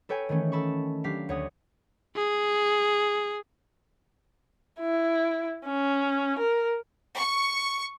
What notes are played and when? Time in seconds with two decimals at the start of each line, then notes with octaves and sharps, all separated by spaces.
0.09 A4 B4 C#5 G5 G#5
0.29 D#3 E3 A3 C#4
0.52 A4 A5 B5 C#6
1.04 F#3 D4 G4 F5 B6
1.29 D2 C#5 F#5 D#6
2.16 G#4
4.80 E4
5.66 C#4
6.39 A#4
7.17 C#6 C#7